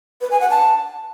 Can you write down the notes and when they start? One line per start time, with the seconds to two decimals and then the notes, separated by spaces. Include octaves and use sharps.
0.21 B4
0.31 G#5
0.40 F#5
0.50 A5